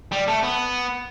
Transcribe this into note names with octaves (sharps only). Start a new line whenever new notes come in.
G3
A3
B3